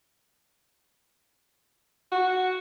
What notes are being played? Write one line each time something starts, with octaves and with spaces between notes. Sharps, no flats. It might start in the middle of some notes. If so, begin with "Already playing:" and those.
F#4